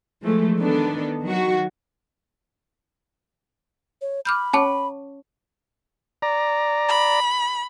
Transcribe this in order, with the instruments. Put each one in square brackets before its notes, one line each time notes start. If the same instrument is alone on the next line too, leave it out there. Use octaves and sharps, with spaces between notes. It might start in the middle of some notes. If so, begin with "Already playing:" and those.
[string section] E3 F3 G#3 A3
D#3 B3 D4 A4
D#3 F#3 F#4
[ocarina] C#5
[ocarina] B5 [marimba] D6 F6 G6
[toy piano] C#4 A5 C#6 [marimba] C#5 D6
[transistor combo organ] D5 A#5
[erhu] B5